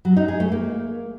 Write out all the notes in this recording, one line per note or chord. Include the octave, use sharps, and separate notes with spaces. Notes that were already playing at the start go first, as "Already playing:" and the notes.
F#3
D#4
G#4
A3
A#3